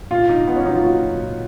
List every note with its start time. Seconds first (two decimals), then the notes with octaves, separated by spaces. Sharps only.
0.11 A#2 F4
0.29 A#2 D#4
0.47 A#2 B3
0.56 C#4
0.65 F#3 D#4
0.74 F4
0.84 A#3 F#4
1.01 F#3
1.20 A#2